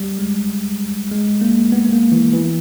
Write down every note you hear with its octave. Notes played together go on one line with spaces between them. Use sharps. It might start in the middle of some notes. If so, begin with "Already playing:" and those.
Already playing: G3
G#3
G#3
A#3
B3
A#3
E3
E3